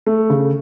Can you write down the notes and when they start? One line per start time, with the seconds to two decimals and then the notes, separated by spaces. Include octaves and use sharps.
0.06 A3
0.30 C#3